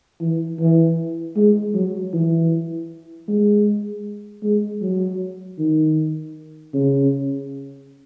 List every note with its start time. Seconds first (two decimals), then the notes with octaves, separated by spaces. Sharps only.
0.20 E3
0.59 E3
1.36 G#3
1.74 F#3
2.13 E3
3.28 G#3
4.43 G#3
4.82 F#3
5.59 D#3
6.73 C#3